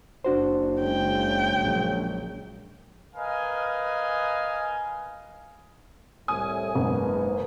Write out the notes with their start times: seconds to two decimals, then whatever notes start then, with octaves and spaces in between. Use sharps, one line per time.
0.25 F#1 D4 F#4 C5
0.81 C#3 G#3 G5
1.57 A#1 F#3
3.15 A#4 B4 D#5 F5 G#5
6.28 C2 A2 G#5 D#6
6.75 F#1 G#2 B3 A#4